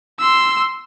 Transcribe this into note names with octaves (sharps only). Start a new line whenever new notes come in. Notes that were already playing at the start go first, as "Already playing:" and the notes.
C6 E6